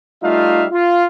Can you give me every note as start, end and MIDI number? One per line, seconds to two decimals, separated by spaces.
0.23 0.66 55
0.23 0.66 57
0.23 0.66 63
0.23 0.66 65
0.23 0.66 76
0.23 0.66 77
0.72 1.06 65